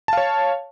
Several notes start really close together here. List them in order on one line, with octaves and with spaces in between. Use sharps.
A5 F5 C#5